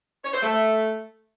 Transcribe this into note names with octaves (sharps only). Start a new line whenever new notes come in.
C#5
C5
A3